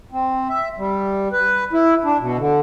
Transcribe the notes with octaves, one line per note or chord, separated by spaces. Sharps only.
C4
E5
G3
B4
E4
D4
B2
D3